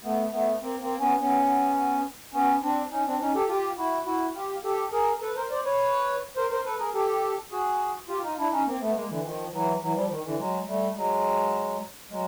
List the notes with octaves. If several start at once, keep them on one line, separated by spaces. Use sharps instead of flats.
A3 B3
A3 B3
A#3 C4
A#3 C4
B3 C#4
B3 C#4
B3 C#4
C4 D4
C#4 D#4
C4 D4
C#4 D#4
G4 A4
F4 G4
E4 F#4
E4 F#4
F4 G4
G4 A4
G#4 A#4
A4 B4
A#4 C5
C5 D5
B4 C#5
A#4 C5
A#4 C5
A4 B4
G#4 A#4
G4 A4
F#4 G#4
F4 G4
D#4 F4
D4 E4
C#4 D#4
A#3 C4
A3 B3
G#3 A#3
D3 E3
D#3 F3
E3 F#3
E3 F#3
F3 G3
D#3
D3 E3
F#3 G#3
G3 A3
F#3 G#3
F#3 G#3